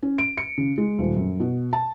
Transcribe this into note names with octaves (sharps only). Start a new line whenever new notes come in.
C#4
D7
C#7
C#3
G#3
D#1
F#2
B2
A5